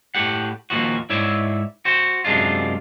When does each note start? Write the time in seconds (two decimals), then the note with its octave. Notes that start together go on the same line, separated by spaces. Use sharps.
0.15 A2 G4 F#5
0.70 D#2 A#2 F3 F#4
1.10 G#2 E4 C#5 D5 E5
1.85 F#4 C5
2.25 F#2 C3 G#3 D4 F4